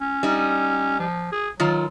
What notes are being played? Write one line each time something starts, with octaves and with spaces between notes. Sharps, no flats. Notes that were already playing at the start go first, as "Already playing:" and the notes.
C#4
G3 D#4
F3
G#4
D#3 F#3 F4